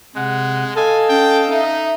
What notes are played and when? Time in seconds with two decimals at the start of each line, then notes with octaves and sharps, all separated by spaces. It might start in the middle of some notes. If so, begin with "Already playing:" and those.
0.16 C3 G#3 F#5
0.76 A4 D#5 F5 G#5
1.09 C#4 G5
1.51 D#4 E5